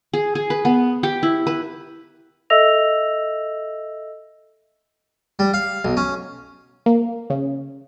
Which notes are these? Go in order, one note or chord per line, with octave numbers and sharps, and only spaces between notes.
G#4
G#4
B4
B3
G4
E4
B4
A4 D#5 E5 E6 A#6 F7
G3
F5
B1
C#4
A#3
C#3